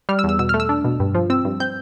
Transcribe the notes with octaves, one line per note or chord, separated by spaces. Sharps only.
G3 F6
E6
E2
E6
B2 E6
F6
A3
E6
D4
B2
G2
F3
C4 E6
G2
C4 G6